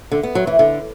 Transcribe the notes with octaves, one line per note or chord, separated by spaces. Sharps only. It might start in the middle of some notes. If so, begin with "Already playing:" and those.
D3
B3
F#3
E3
D3